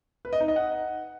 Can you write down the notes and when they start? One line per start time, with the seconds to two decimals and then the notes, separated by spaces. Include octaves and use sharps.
0.25 B4
0.33 D#5
0.40 D#4
0.48 D#5
0.56 F#5